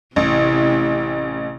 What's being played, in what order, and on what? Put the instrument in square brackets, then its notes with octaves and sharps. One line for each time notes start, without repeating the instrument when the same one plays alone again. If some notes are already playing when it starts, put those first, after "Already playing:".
[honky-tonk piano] A1 [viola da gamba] C3 E4